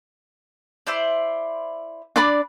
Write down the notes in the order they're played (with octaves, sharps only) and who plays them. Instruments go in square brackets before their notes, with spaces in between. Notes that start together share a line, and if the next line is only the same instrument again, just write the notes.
[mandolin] E4 C5 D5
[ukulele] D4 D5 B5